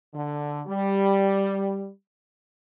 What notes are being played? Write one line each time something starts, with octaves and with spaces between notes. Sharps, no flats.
D3
G3